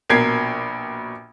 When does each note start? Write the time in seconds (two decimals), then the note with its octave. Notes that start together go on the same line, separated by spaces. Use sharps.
0.10 A#1 B2 A#4 G#6 B6 C7